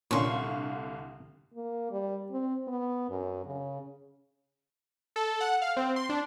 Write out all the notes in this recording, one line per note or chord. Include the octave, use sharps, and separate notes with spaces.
C2 A#2 D3 C#4 D4 F5 C6 C#6
A#3
G3
C4
B3
F#2
C#3
A4
F#5
F5
C4
C6
D4